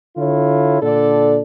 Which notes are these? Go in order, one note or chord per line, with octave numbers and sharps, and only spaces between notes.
D3 E4 F4 A4 C#5
A#2 D3 D4 A4 D5